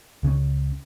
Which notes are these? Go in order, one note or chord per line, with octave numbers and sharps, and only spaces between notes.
C#2 C#3 E3 C#4